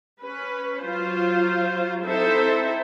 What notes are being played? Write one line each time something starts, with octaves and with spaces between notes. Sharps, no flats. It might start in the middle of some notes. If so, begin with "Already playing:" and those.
C#4 B4
F#3 F4 C5
C4 D#4 E4 A4 C5 E5